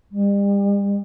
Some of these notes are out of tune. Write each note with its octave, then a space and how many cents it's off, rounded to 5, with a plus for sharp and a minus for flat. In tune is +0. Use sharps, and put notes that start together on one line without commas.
G3 +40